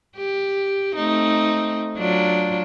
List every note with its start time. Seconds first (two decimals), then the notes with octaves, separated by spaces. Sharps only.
0.17 G4
0.96 A3 C4 D#4
1.97 F#3 D4 F4